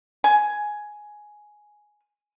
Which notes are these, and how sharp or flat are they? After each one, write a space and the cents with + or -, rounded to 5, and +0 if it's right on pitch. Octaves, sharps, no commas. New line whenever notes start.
G#5 +10